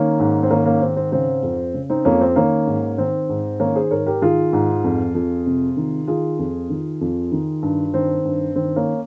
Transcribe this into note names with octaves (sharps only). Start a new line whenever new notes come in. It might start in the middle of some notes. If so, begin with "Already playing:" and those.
Already playing: D#3 A#3 C#4
G#2
C4
D#3 A#3 C#4
A#3 C#4
G#2 C4
C4
C#3 C4
F2
C#3
C4 D#4
F2 A#3 C#4
C4
D#3 A#3 C#4
G#2
D#3 C4
G#2
D#3 A#3 C#4
G#4 C5
G#2 A#4 C#5
G4 A#4
D#3 F4 G#4
G#2
F2
F2
C3
D#3
D#3 F4 G#4
F2
D#3
F2
D#3
G2
D#3 C4
G2
D#3 C4
A#3 C#4